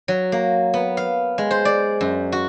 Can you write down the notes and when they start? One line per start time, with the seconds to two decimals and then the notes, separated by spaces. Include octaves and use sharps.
0.08 F#3
0.32 A#3
0.74 B3
0.97 F5
1.38 G#3
1.51 C5
1.65 D5
2.01 F#2
2.32 F#4